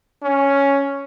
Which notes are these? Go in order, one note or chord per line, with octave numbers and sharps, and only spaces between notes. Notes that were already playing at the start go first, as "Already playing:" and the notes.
C#4